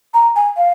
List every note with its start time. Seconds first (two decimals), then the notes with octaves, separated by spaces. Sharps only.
0.14 A#5
0.36 G#5
0.57 F5